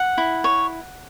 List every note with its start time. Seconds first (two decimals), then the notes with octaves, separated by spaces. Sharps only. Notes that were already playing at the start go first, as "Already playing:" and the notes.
Already playing: F#5
0.18 E4
0.44 C#5